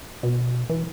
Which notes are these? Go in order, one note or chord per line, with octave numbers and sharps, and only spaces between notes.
B2
E3